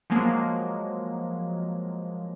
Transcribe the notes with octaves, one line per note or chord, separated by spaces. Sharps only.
F3 F#3 G#3 A#3